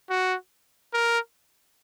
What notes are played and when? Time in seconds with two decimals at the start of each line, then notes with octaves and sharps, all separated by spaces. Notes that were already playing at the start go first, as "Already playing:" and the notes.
0.10 F#4
0.94 A#4